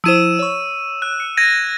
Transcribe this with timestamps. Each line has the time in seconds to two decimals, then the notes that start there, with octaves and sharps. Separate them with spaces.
0.04 F3 E4 C5 E6 D#7 E7
0.39 C#5 C#6
1.02 F#6
1.20 C#7
1.37 G#6 A#6 D#7